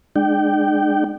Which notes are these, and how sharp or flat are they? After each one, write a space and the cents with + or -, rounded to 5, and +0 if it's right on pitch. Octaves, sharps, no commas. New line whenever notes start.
G#3 +0 D4 +35 G5 -20